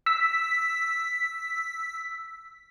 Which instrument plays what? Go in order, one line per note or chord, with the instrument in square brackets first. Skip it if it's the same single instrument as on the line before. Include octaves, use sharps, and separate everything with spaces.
[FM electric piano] E6 B6